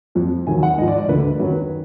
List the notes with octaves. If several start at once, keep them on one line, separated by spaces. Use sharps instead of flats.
F2 F3
D#2 D#3 F#3 G#5
F#5
G#2 F3 D#5
D5
D5
D2 D3 F3 B4
F#2 D#3 F#3 B4